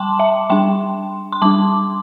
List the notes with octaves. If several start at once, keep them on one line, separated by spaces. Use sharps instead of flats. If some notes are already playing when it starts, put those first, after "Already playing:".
Already playing: G3 G5 A5 C6 D6
E5 A5
G3 D4 G5 C6
C6
G3 D4 A5 D6